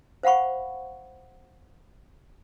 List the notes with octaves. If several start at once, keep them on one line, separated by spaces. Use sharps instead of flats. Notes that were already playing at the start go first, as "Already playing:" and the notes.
C5 F5 F#5 B5 C#6